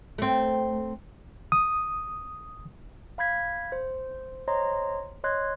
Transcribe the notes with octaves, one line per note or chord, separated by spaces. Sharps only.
A3 C4
D#6
F5 B5 G6 G#6 B6
C5
C5 C#5 D#5 A#5 C6
C#5 D#5 C6 F#6 G#6